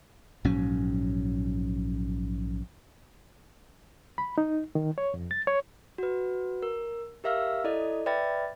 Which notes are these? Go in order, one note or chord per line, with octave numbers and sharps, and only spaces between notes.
A#1 G#2 F#3 C#4
B5
D#4
D#3
C#5
F2
A6
C#5
F#4 B4
A#4
G4 A#4 E5 F5 E6 F6
E4 A4 D5 D#5
B4 D5 E5 G5 B5 A6